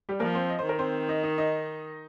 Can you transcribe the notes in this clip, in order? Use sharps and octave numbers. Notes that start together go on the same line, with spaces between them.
G3 G4
F3 A#3 A#4
C4 C5
D#5
C5
D#3 A#4
C4 C5
D#4 D#5
D#4 D#5
D#4 D#5